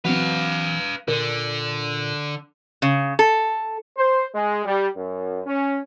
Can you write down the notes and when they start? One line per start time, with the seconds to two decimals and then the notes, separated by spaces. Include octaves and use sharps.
0.05 E3 F#3 C4 B4 F5
1.08 A#2 D3 A#4
2.82 C#3
3.19 A4
3.97 C5
4.34 G#3
4.65 G3
4.96 F#2
5.47 C#4